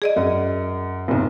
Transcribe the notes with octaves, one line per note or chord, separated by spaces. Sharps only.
G#4 D5 D#5
F#2
F#1 B1